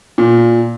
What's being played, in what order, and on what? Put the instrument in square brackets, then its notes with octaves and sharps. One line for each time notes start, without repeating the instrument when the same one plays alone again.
[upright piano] A#2